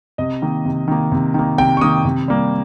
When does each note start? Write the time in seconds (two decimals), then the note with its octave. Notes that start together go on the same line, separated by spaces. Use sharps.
0.18 C3 D#5
0.42 D#3 A#3
0.65 C3
0.88 D#3 A#3
1.12 C3
1.34 D#3 A#3
1.58 C3 G5
1.77 C#6
1.81 D#3 A#3 D#6
2.05 C3
2.28 G3 A#3